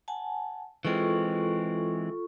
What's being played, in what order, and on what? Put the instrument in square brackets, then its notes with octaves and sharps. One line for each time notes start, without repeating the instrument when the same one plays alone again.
[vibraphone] F#5 G#5 A5
[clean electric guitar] E3 G#3 C4 [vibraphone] F4 A4 C#6